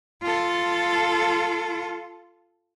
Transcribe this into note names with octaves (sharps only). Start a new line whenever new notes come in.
F4 A4